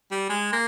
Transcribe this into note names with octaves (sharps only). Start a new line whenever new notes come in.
G3
G#3
A#3